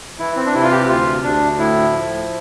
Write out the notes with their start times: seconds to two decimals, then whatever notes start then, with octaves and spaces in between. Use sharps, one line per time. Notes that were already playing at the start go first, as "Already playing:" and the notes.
0.19 E3 E4
0.36 C4
0.46 D4
0.54 C3 E4
0.63 F4
0.72 G4
0.89 D2 F4
1.24 D2 D4
1.58 A2 E4
1.93 F3